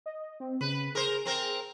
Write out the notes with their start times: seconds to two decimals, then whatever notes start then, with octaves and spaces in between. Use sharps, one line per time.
0.06 D#5
0.40 C4
0.61 C#3 B4
0.95 G#4 A#4 C5
1.25 C4 A#4 C5